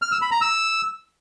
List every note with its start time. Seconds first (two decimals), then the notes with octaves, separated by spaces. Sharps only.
0.02 F6
0.12 E6
0.22 B5
0.31 A#5
0.41 E6